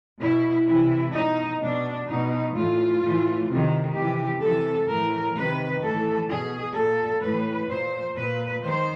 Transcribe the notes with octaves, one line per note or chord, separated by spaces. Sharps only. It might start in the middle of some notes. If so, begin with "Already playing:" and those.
B2 E4
C3 E3 E4
B2 D#4
B2 D4
B2 D#4
A2 E3 F4
A2 E3
C3 D#3
C3 E3 G4
C3 E3 A4
A2 E3 A#4
C3 D#3 B4
A2 E3 A4
B2 G#4
A#2 A4
A2 E3 B4
A#2 C5
A#2 B4
D#3 C5